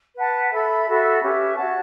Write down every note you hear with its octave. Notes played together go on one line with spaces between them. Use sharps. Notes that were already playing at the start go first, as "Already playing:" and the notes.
B4 F#5 A5
A4 E5 B5
F#4 A4 E5 B5
C#4 G4 B4 E5
F#4 C#5 F#5 A5